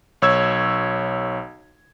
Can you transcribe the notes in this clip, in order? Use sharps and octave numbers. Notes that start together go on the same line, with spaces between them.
B1 C#5 E6 G#6